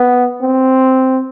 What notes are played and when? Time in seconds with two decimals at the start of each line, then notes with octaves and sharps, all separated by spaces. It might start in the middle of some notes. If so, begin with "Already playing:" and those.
Already playing: B3
0.42 C4